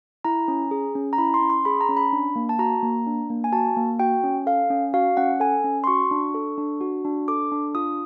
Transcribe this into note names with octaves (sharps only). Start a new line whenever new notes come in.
E4 A#5
C#4
G#4
C#4
A#5
E4 B5
C6
C#4
C6
G#4 B5
A#5
C#4
B5
D4
A#3
A5
F#4 A#5
A#3
D4
A#3
G#5
F#4 A5
A#3
F#4 G5
C#4
A4 F5
C#4
F#4 F5
C#4 F#5
A4 G#5
C#4
C6
F#4 C#6
D4
A4
D4
F#4
D4
A4 D6
D4
F4 D#6